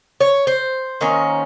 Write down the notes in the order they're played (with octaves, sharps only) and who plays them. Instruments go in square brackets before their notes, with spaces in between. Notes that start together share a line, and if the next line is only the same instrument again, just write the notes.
[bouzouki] C#5
C5
D#3 A#3 C#4